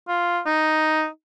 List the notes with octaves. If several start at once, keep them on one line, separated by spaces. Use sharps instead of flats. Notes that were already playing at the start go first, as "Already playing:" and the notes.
F4
D#4